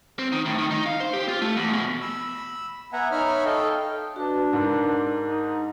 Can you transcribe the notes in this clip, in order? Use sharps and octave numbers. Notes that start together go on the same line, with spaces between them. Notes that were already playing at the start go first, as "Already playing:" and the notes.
C4
D#3
A2
D#3
D#4
F5
C5
G4
F4
A3
E2
B2
B5 E6
B3 E5 F#5 G#5 A#5
D#4 C#5 E5 A#5 B5 F6
A4 D#5 F5 G5
D4 F#4 B4
G#2 A#4 A#5
D#4